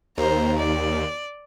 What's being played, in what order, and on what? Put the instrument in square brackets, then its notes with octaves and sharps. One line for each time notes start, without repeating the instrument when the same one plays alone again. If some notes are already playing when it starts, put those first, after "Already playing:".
[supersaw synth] D#2 [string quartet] C5 A#5
[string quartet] D5